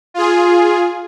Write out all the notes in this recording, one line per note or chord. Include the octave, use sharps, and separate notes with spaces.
F4 G#4